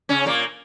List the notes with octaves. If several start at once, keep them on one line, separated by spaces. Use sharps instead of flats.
C#3 C#4
A#2 A#3